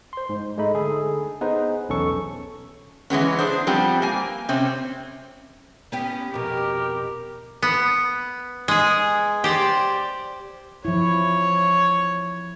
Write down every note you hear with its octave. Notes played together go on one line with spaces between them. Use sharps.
C5 C6
G#2
G#3 A3 D#4 B5
D3 G#4 A4
B3 D#4 G#4 B4 C5
B1 E2 C#4 A4 C#6
E3 G#3 B3 C#4
D4 G#4 C5
F3 G3 B3 C4 G4
A#3 G#5
C3 C4 C#4
B3 C#4 G4
F2 B2 G4 A#4
B3
G#3 G#4
G4 C5 D5
F3 E4 C#5